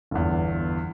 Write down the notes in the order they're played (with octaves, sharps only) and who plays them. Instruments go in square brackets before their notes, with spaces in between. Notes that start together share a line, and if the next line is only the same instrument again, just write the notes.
[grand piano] G1 E2